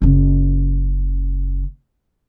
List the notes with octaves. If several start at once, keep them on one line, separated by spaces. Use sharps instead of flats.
F#1 C#3